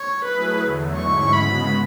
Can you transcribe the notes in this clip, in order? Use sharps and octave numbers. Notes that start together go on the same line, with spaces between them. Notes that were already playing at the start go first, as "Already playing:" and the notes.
Already playing: C#5
F#3 A3 E4 G#4 B4
E2 D3 F#3 A3
G#2 G#3 C#4 E4 C#6
C#3 G#3 B3 F#4 B5